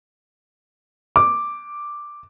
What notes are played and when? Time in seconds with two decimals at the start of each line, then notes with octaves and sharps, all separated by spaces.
1.16 D6